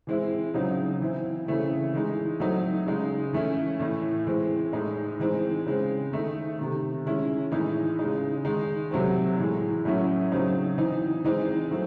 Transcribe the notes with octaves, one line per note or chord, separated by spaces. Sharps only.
E3 G#3 C4 E4
C#3 F#3 C4 D#4
E3 C4 E4
C#3 E3 A3 C4
E3 G#3 D#4
F#3 A3 C4 D#4
C#3 G#3 D#4
E3 A3 C#4 E4
A2 E3 A3
E3 G#3 C4
A2 G#3 D#4
E3 G#3 C4 D#4
C#3 G#3 C4
D#3 A3 D#4
C3 D#3 A3
D#3 G#3 C#4 E4
A2 E3 G#3 D#4
C#3 G#3 D#4
D#3 G#3 D#4
C3 F#3 A3 C4
A2 E3 G#3
A2 F#3 A3 C#4 E4
C#3 F#3 C4 D#4
E3 C4 D#4
E3 G#3 C4 D#4
F#3 A3 C4